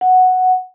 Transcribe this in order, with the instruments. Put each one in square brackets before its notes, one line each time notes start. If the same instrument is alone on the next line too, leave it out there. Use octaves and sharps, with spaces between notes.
[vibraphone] F#5